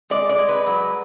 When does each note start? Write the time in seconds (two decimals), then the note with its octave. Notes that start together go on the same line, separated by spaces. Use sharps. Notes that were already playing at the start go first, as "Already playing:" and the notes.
0.10 G#3 D5
0.29 D5
0.38 G#3
0.49 B4
0.66 F#3